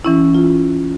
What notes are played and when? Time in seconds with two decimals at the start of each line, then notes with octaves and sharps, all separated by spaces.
0.04 E3 C#4 E4
0.34 F4